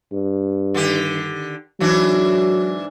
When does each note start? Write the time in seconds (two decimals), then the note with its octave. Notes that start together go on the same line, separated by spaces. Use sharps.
0.13 G2
0.74 D3 D#3 G4
1.80 G#2 E3 F#3 D4